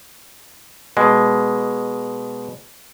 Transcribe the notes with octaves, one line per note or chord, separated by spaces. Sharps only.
B2 G#3